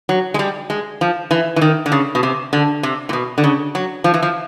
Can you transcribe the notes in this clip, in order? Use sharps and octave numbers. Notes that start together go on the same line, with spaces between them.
F#3
G#3
G3
G#3
F3
E3
E3
D#3
D3
C#3
B2
C3
D3
C3
A#2
B2
D3
C#3
F#3
F3
E3
F3